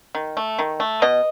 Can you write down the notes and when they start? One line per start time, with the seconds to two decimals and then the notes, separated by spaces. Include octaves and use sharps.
0.15 D#3
0.37 A3
0.59 D#3
0.80 A3
1.02 B2 D#5